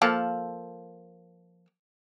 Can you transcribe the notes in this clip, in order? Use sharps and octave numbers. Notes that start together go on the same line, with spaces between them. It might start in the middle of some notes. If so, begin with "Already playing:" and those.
F3 A#3 A4